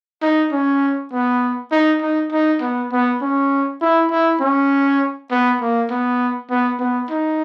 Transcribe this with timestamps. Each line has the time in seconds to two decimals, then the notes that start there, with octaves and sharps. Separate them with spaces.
0.22 D#4
0.52 C#4
1.12 B3
1.72 D#4
2.02 D#4
2.32 D#4
2.61 B3
2.92 B3
3.22 C#4
3.81 E4
4.10 E4
4.40 C#4
5.31 B3
5.61 A#3
5.90 B3
6.50 B3
6.79 B3
7.10 D#4